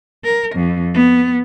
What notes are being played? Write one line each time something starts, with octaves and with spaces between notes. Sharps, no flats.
A#4
F2
B3